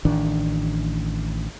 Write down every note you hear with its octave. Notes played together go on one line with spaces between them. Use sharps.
A1 D#3 D4